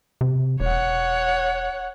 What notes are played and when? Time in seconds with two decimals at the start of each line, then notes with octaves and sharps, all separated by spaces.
0.21 C3
0.60 E1 C#5 F#5